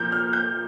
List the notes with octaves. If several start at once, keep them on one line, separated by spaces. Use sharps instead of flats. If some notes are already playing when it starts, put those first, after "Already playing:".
Already playing: A#2 F3 A#3 G6
F6
G6